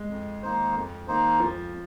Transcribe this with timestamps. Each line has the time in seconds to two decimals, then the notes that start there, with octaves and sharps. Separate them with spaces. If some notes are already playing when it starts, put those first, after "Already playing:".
Already playing: G#3
0.10 F2
0.43 D#3 A#3 D#4 C5
0.76 F2
1.08 D#3 A#3 D#4 C5
1.40 F2 F3